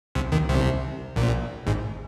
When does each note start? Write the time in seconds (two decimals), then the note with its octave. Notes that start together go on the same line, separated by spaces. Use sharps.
0.15 C2 C3
0.32 D#2 D#3
0.49 C2 C3
1.16 A#1 A#2
1.67 G#1 G#2